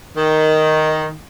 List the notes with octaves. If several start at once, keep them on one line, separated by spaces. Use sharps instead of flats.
D#3